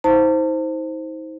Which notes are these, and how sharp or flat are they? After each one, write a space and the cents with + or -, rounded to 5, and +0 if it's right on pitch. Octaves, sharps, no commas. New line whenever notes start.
D#4 +40 C5 +0 A5 +35